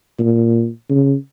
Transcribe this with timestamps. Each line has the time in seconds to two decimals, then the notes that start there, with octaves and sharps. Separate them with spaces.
0.19 A#2
0.90 C#3